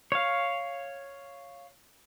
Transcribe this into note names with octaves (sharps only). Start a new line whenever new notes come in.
C#5 F5